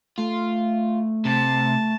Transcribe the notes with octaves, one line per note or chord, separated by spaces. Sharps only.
A3 F4
C3 A5